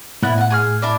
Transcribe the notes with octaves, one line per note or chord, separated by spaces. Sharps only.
A2 B3 D4 E4 F#6
F#5 G#5
G#4 C#6 F6
D4 E4 D5